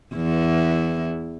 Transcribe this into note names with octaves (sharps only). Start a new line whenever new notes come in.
E2 E4